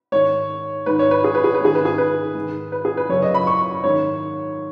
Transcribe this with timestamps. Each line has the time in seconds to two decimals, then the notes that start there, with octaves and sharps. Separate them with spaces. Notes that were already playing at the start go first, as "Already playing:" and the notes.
0.12 G#2 D#3 C#5
0.86 G#2 D#3 B4
0.99 C#5
1.11 B4
1.24 G#4
1.35 B4
1.44 G#4
1.54 B4
1.61 G#2 D#3 G#4
1.75 B4
1.85 G#4
1.98 B4
2.35 G#2 D#3
2.72 B4
2.85 G#4
2.97 B4
3.09 F#2 C#3 C#5
3.22 D#5
3.34 B5
3.47 C#6
3.84 G#2 D#3 C#5